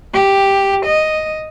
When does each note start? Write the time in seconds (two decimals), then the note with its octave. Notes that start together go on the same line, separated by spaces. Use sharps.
0.14 G4
0.85 D#5